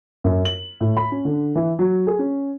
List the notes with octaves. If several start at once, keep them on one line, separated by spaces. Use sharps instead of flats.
F#2
F#7
A2
B5
C#4
D3
E3
F#3
G#4
C#4